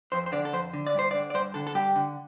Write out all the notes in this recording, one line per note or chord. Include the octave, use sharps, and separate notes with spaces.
F2 C5
C5
D3 D5
A4
F2 C5
D3
D5
G2 C5
D5
D3
D5
G2 C5
D3 A4
A4
G2 G4
D3